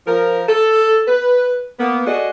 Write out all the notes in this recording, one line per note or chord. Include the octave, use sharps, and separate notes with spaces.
F3 A#4
A4
B4
A#3 B3
A3 F#4 G#4 D5 D#5